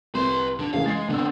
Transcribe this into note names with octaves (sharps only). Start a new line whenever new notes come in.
C2 B4 C6
D3 D4
C#3 E3 A#3 F5
G#3 A6 C7
D3 B3 C4 E6